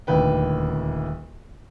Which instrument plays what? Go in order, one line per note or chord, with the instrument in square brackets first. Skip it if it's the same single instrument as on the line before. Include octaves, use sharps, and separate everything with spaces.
[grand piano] D#1 D2 B4 G5